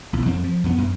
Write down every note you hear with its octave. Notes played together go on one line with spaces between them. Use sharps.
B1 E2
F2 C4
F3
F2 B3
F#2